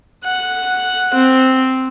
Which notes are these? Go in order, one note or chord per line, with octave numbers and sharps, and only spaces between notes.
F#5
C4